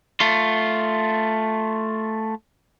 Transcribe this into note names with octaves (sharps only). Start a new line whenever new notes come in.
A3 F4